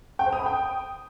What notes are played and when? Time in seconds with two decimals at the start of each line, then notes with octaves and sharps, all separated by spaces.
0.19 G5
0.26 C5
0.33 D#6
0.39 B5
0.46 G5